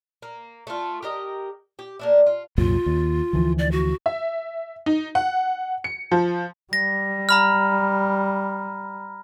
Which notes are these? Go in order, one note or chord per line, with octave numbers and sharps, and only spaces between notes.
A#3
A3 F4
G4 A#4 D#5
G4
A#3 D4 E4
F4
C2 F#2 A#2 F4
D#2
D2 E3 F3
D5
F#4
E5
D#4
F#5
C#7
F3
G3 A#6
A#5 B5 F6